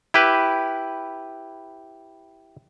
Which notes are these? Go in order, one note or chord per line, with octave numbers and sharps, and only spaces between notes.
E4 G4 B4